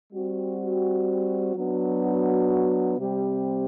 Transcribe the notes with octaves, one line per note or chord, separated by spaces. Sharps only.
G3 C4 F#4
F#3 B3 D4 F#4
C3 G3 C4 G4